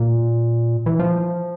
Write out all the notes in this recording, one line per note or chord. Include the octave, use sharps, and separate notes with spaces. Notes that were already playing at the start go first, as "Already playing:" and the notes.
Already playing: A#2
E3
F3